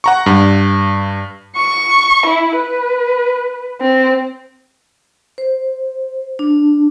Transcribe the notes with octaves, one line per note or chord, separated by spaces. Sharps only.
F#5 A#5 C#6
G2
C#6
E4
B4
C4
C5
D4